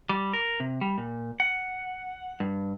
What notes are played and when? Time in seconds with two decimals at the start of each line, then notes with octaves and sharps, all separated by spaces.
0.09 G3
0.33 A#4
0.60 C3
0.81 G3
0.98 A#2
1.40 F#5
2.40 G2